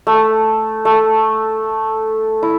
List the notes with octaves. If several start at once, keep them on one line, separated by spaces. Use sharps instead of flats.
A3
A3
E4